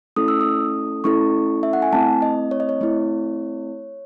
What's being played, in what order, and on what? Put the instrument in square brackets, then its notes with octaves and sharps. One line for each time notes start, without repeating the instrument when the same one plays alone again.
[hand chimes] A3 C#4 E4 A4 D#6
E6
D#6
A3 C#4 E4 A4 C#6
E5
F#5
G#5
A3 C4 E4 A5
D#5
C#5
D#5
C#5
A3 C4 E4